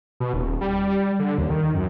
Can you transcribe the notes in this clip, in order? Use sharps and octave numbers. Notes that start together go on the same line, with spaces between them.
B2
D#1
G3
G3
D3
D#2
D#3
F#2